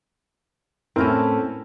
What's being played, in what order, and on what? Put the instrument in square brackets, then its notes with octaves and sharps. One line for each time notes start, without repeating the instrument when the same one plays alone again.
[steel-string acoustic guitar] A2 A3 A4 [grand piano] C4 C#4 [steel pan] E4 A#4